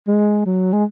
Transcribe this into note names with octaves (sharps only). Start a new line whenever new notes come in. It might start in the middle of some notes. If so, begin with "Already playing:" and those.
G#3
F#3
G#3